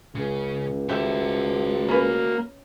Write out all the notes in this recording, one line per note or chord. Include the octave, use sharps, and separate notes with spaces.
C#2 C#3
F#4 G4 A4 C5 E5
A#3 C#4 B4